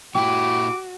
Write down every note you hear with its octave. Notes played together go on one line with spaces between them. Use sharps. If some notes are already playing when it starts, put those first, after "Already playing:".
A#2 E4 F#4 G4 D6